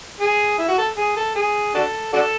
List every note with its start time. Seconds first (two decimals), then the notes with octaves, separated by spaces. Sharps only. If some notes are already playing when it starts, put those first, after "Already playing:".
0.21 G#4
0.58 E4
0.68 F#4
0.78 A4
0.98 G#4
1.17 A4
1.35 G#4
1.74 D4 F#4 A4
2.13 D4 F#4 A4